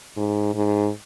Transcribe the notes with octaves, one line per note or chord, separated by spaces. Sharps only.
G#2
G#2